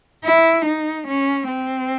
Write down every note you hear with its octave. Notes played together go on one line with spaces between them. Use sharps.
E4
D#4
C#4
C4